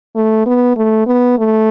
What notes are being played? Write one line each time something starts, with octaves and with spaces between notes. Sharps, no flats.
A3
B3
A3
B3
A3